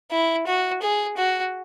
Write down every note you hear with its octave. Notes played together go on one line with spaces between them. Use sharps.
E4
F#4
G#4
F#4